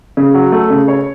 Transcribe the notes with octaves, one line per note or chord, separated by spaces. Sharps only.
C#3
F#3
A3
C#3
C#5